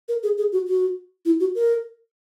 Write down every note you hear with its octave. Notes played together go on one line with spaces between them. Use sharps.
A#4
G#4
G#4
F#4
F#4
E4
F#4
A#4